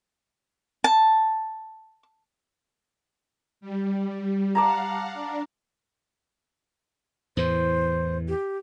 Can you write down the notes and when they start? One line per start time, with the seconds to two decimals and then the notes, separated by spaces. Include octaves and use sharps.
0.84 A5
3.61 G3
4.55 D5 F5 F#5 A5 A#5
5.14 D4
7.37 E2 A2 E3 C5
8.28 G4